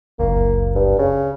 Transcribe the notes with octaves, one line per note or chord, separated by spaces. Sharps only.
F#1 C#2 A#3
G2
C#3